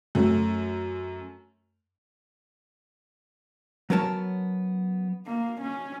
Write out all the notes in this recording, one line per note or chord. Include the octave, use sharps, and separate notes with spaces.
F#2 A3
F#3 B3 C#4 A#4 C#5 A5
A#3
C#4